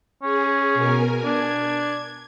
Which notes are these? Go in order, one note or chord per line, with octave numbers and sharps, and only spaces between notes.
C#4 G#4
B2 A#4 G#5
D4 G#6